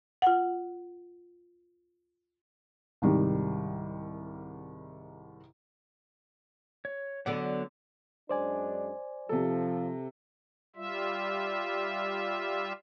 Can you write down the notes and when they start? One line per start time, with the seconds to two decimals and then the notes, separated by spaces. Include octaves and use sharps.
0.22 F4 F#5
3.02 C2 G#2 D#3 G3
6.85 C#5
7.26 D3 F#3 B3 D5 F#5
8.29 F#2 G#3 D4 C5 D5 G#5
9.29 C3 F3 A4
10.76 G3 F4 E5